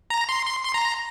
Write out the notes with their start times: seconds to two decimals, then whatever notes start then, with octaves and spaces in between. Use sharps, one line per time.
0.10 A#5
0.29 C6
0.47 C6
0.65 C6
0.74 A#5